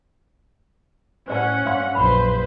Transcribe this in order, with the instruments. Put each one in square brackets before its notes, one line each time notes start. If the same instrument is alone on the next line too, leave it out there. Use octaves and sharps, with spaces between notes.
[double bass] A2 [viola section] C#4 F#5 [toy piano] C5 D5 A5
[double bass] G2 [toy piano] D4 F5 C6
[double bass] A#1 F#2 [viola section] B4 C5 [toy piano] B5